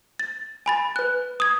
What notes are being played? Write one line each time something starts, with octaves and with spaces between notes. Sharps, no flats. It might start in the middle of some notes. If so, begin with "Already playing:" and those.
A6
G#5 B5 A6
B4 F#6
D#6 G#6